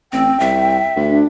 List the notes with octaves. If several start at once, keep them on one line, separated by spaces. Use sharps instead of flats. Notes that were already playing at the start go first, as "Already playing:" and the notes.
A1 C4 G5
C2 E5
D2
D4